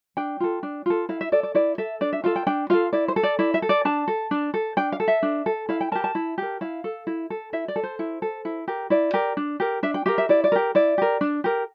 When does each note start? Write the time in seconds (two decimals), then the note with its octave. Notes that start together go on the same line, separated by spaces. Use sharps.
0.17 D4 G5
0.40 F4 A4
0.63 D4
0.86 F4 A4
1.09 E4 F5
1.21 E5
1.32 A4 D5
1.43 D5
1.55 E4 D5
1.78 A4 E5
2.01 D4 D5
2.13 E5
2.24 F4 A4 F5
2.36 G5
2.47 D4 G5
2.70 F4 A4 F5
2.93 E4 D5
3.08 C5
3.16 A4
3.23 D5
3.39 E4 D5
3.54 E5
3.62 A4
3.69 D5
3.85 D4 A5
4.08 A4
4.31 D4
4.54 A4
4.77 D4 G5
4.92 F5
5.00 A4
5.08 E5
5.23 D4
5.46 A4
5.69 E4 F5
5.81 G5
5.92 A#4 A5
5.95 G4
6.04 A5
6.15 E4
6.38 G4 A#4
6.61 E4 F5
6.84 A4
7.07 E4
7.30 A4
7.53 E4 E5
7.68 D5
7.76 A4
7.83 C5
7.99 E4
8.22 A4
8.45 E4
8.68 G4 A#4
8.90 E4 D5
9.14 G4 A#4
9.37 D4
9.60 G4 A#4
9.83 D4 E5
9.94 G5
10.06 G4 A#4 F5
10.18 E5
10.29 E4 D5
10.44 D5
10.52 G4 A#4
10.75 E4 D5
10.98 G4 A#4
11.21 D4
11.44 G4 A#4